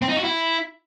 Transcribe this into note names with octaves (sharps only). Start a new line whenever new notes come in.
C4
D#4
F#4
E4